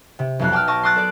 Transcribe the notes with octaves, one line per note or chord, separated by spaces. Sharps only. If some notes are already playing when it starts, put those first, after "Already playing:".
C3
B1 F2 F#6
G5 A5 D6 E6 F6
D#5 A5 C#6
C6 D6 D#6 F#6 A6
A4 D5